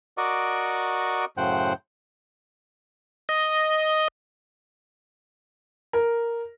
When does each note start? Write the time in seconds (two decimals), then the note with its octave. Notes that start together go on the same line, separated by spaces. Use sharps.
0.18 F#4 A#4 D5 D#5 C#6 D6
1.37 F#2 A2 C#3 C5 F#5 G5
3.29 D#5
5.93 A#4